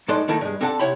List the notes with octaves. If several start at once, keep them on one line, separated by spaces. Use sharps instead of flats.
A2 G#3 D#4 A4 D5 C6
D#3 A3 A#3 E4 A4 A#4
G2 G#3
C4 D4 A4 F#5 G#5 A5
C3 E4 C#5 F#5 G5 B5